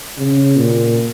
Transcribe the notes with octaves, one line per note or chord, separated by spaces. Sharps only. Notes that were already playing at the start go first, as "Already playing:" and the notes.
C#3
A#2